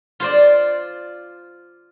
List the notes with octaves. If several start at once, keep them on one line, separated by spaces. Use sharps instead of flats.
F4 C5 D5